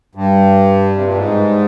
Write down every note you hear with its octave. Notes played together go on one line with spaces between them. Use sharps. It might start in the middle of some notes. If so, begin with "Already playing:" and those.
G2
C3
A#2
G#2